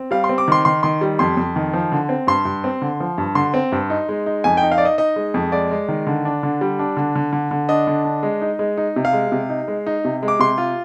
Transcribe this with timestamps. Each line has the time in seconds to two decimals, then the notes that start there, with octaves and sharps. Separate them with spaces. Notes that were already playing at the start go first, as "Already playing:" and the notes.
Already playing: C4
0.11 G3 F5
0.24 C6
0.29 C4
0.38 D6
0.48 D#3 C6
0.65 D#3 C6
0.83 D#3 C6
1.01 G3
1.19 F2 C6
1.37 F2
1.56 D#3
1.74 F3
1.92 D3
2.09 C4
2.27 G2 C6
2.45 G2
2.64 C4
2.82 D3
3.00 F3
3.18 G2
3.35 D3 C6
3.54 C4
3.72 G2
3.90 D#4
4.09 G#3
4.26 D#4
4.44 F2 G#5
4.57 G5
4.63 D#4
4.71 F5
4.78 D5
4.80 D#4 D#5
4.98 D#4 D#5
5.16 G#3
5.34 F2
5.52 G#3 D5
5.71 G#3
5.88 D#3
6.07 D3
6.25 D4
6.43 D3
6.61 G3
6.79 D4
6.97 D3
7.15 D3
7.33 D3
7.51 D3
7.69 D4 D#5
7.87 D3
8.05 D4
8.23 G#3
8.42 D#4
8.59 G#3
8.77 D#4
8.96 C3
9.05 F5
9.13 G#3
9.32 C3
9.49 D#4
9.68 G#3
9.87 D#4
10.05 C3
10.23 G#3
10.28 D6
10.39 C3 C6
10.58 F4